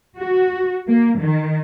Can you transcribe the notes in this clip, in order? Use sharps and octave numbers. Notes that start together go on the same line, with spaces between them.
F#4
A#3
D#3